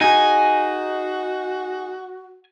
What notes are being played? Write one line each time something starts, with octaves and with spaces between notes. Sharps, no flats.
D#4 F#4 G#4 G#5